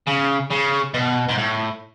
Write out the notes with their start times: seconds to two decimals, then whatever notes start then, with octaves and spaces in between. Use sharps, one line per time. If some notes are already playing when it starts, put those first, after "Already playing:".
0.07 C#3
0.51 C#3
0.94 B2
1.29 G#2
1.38 A2